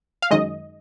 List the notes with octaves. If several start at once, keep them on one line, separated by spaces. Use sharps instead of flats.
F5
F#2 D#3 G#3 D#5